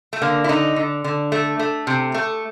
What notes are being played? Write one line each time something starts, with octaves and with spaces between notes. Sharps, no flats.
A3
D3 A#3
E4
D3 D#4
D3
D3
A3
A3
C3
A3